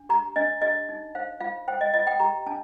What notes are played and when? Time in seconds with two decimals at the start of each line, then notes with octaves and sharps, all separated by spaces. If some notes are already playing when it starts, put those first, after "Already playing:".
Already playing: D4
0.09 G4 A#5
0.36 D4 D#5
0.62 G4 D#5
0.89 D#4
1.15 C5 F5
1.40 F4 F5
1.68 C5 G5
1.81 D#5
1.94 F4 D#5
2.07 G5
2.20 G4 A#5
2.46 D4 A5